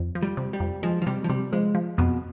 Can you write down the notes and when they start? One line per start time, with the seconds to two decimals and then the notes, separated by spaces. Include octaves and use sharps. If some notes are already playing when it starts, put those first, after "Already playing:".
Already playing: F2
0.15 F3
0.23 G3
0.37 C3
0.53 G3
0.60 F2
0.83 F3 G#3
1.02 F3
1.07 C3 G3
1.24 F3
1.29 C3 G3
1.53 F3 G#3
1.75 F3
1.98 F2 B2